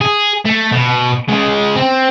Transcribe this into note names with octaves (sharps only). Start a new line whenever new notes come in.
G#4
A3
B2
C#3 G#3
C4